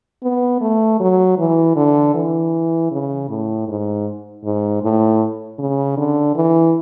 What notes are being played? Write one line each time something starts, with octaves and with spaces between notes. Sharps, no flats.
B3
A3
F#3
E3
D3
E3
C#3
A2
G#2
G#2
A2
C#3
D3
E3